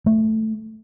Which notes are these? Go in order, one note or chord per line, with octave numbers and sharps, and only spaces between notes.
A3